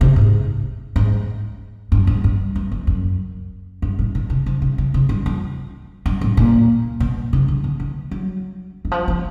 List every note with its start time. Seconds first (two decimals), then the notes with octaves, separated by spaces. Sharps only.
0.01 C3
0.16 G#2
0.96 G#2
1.92 G2
2.07 G#2
2.24 G2
2.56 G2
2.72 F2
2.87 F#2
3.82 G2
3.99 A2
4.15 B2
4.30 C3
4.46 C3
4.62 C3
4.78 C3
4.94 C3
5.09 G2
5.26 F2
6.06 G2
6.21 A2
6.37 A#2
7.00 B2
7.33 C3
7.48 C#3
7.64 D3
7.80 E3
8.11 F#3
8.85 E3
8.91 F3
9.08 F3